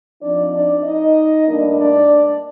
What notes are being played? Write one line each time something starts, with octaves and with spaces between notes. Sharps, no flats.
F3 C4 D4 D#4 D5
D4 D5
D#4 D#5
A2 G3 A#3 D4
D4 D5